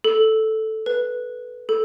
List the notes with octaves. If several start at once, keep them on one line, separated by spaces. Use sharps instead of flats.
A4
B4
A4